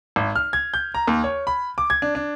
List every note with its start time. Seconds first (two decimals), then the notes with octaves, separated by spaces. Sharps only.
0.16 G#1
0.36 F6
0.53 G#6
0.74 G6
0.94 A#5
1.07 D#2
1.24 C#5
1.47 B5
1.78 D6
1.90 G#6
2.02 D4
2.15 D4